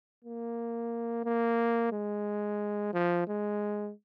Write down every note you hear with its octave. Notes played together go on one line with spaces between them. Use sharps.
A#3
A#3
G#3
F3
G#3